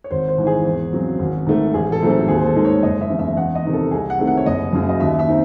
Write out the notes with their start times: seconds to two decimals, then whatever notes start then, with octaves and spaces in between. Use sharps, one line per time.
0.04 C#5
0.11 G#1 C5
0.28 C5
0.38 G#2 E3
0.47 G#4
0.66 E2
0.93 C#3 F#3 C4
1.19 G#1
1.46 G#2 D#3 A3
1.74 A1 G#4
1.92 A4
2.01 G#2 F#3 A3 C4
2.10 A4
2.28 D#2 G#4
2.38 C5
2.46 A4
2.55 D#3 G#3 D#4
2.65 C#5
2.83 F#1 D#5
3.01 E5
3.10 E2 C#3
3.19 E5
3.37 E2 F#5
3.55 D#5
3.65 C3 D#3
3.73 A4
3.91 C2 G#4
4.10 F#5
4.19 C3 D#3 A3
4.27 F#5
4.37 C#5
4.46 F#1 D#5
4.73 F#2 C#3 F#3
4.89 D#5
5.00 D#2 E5
5.19 E5
5.28 C4 D#4